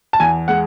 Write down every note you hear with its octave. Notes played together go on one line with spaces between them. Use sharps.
A5
E2 G#5
G#3 F#5